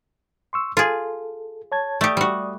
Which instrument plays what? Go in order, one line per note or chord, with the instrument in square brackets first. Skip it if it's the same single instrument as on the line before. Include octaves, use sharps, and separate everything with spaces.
[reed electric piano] C6 C#6 E6
[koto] F4 G#4 [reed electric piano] A4
[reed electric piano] C#5 A5 G#6
[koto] A3 G4 [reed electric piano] D5 D#6
[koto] G3 F#4